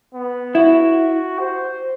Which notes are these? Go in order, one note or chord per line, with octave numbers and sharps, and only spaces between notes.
B3
E4 F#4
C5